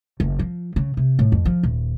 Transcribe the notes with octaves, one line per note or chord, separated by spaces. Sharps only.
F#1
F3
C#3
C3
A2
F2
F3
D#1